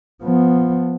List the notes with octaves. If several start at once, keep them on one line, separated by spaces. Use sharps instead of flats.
F3 B3